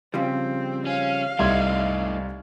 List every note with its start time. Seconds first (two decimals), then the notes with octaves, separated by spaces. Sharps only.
0.14 C#3 F3 G3 C4
0.86 C#4 F5
1.39 C2 A3 D#4 E5 C6 G#6